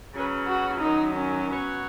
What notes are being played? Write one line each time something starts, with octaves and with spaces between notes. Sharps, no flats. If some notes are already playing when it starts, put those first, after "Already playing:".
C#3 F#3 C#4 B4
F#4
F#2 D#3 F#3 D#4
C#4
F#3 B3 F#4 C#5